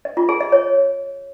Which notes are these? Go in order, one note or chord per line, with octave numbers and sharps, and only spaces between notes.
D#5
F4
G#4
D#5
C#5